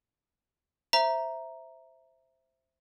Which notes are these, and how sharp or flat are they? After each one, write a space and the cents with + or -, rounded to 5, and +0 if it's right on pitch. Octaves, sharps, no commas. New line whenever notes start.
C5 +0 E5 +0 A#5 +5